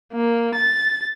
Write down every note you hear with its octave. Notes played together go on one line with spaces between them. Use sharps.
A#3
A6